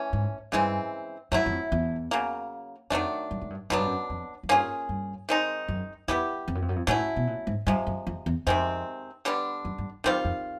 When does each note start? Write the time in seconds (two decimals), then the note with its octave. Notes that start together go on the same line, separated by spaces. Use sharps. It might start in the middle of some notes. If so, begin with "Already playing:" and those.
Already playing: E3 A3 C#4
0.13 G#2
0.52 G2 C#3 E3 G#3 C4
1.32 F#2 F#3 A3 C4 E4
1.46 F#2
1.52 F2
1.72 E2
2.11 C#3 F#3 A#3
2.90 F2 D#3 F#3 A3 D4
3.31 G2
3.41 G#2
3.50 G2
3.70 F#2 B2 F#3 B3 D4
3.78 G2
3.87 F#2
4.10 F2
4.43 F#2
4.49 G2 A#3 C#4 F4 G#4
4.89 G2
5.29 D#3 G#3 C4 D#4
5.68 F#2
6.08 E2 G3 B3 E4 G4
6.48 F2
6.55 F#2
6.62 F2
6.69 F#2
6.76 F2
6.87 A2 F#3 A3 C#4 E4
7.16 B2
7.27 A#2
7.47 G#2
7.67 G2 C3 F3 G#3
7.87 F#2
8.07 F2
8.26 E2
8.46 F2 C3 D#3 G#3 C4
9.25 D3 G3 B3 D4
9.65 F#2
9.78 G2
10.04 F#2 D#3 G3 C4 F4
10.24 F2